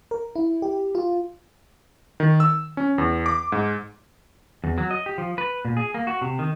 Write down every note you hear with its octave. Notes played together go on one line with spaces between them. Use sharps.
A#4
E4
G4
F4
D#3
E6
C#4
E2
D6
G#2
E2
F#3
D#5
G4
F3
B4
A#2
G#4
A#3
F#4
C3
D#3